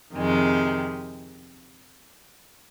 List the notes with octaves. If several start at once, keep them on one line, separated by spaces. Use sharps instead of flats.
F2 C3 D#3 G#3